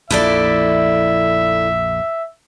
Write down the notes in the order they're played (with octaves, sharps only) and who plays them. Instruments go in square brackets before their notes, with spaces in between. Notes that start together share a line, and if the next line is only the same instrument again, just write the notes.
[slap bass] A#1 F2 [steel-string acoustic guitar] E4 A4 D5 [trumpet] E5